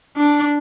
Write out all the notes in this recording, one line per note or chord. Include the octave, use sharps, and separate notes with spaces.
D4